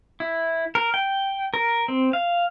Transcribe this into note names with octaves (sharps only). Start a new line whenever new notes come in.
E4
A#4
G5
A#4
C4
F5